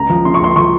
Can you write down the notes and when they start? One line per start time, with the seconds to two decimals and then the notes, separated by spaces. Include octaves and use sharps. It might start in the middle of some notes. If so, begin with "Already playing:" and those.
Already playing: C#2 A#5
0.10 F3
0.25 C#3 C6
0.34 C#6
0.40 C#2 C6
0.56 F3 C#6